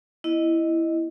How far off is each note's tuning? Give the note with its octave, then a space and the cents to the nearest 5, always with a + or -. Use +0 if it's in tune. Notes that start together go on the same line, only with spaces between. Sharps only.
B3 -10 E4 +0 D#5 +0